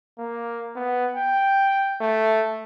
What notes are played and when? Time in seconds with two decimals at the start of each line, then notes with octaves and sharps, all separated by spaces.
0.19 A#3
0.76 B3
1.16 G5
2.01 A3